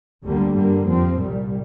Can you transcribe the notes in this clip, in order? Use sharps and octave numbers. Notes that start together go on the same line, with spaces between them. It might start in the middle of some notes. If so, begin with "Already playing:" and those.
D2 D3 G3 A#3
G2 D3 A#3
F2 F3 C4
C2 A#2 G3